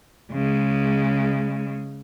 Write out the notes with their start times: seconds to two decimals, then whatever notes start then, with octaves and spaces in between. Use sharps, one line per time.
0.32 C#3 G#3